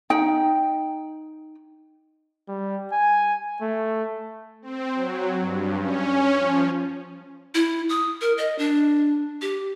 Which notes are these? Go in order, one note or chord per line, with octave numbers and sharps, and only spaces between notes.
D#4 G5
G3
G#5
A3
C4
F#3
G2
C#4
F3
E4
D#6
A#4
D#5
D4
G4